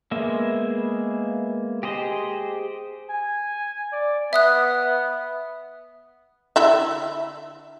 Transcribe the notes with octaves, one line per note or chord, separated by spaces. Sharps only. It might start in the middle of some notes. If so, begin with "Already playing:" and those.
G#3 A#3 B3 E5
G4 G#4 C5 D#5
G#5
D5
B3 E5 D#6 F#6
D3 E4 E5